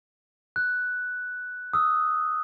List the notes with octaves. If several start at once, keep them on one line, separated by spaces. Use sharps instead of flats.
F#6
D#6 E6